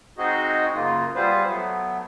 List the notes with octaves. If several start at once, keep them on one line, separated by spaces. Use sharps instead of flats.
G#3 C4 D#4 F#4 G#4 D#5
F#2 C#3 A#3 F4
G3 B3 F4 G#4 B4 C5
F#3 A3 B3